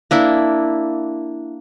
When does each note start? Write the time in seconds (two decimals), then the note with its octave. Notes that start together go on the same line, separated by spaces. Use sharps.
0.11 A#3 D4 E4